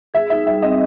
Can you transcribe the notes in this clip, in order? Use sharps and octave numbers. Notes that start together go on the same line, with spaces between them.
G#4 E5
D#4 E5
G3 E5
C4 D#5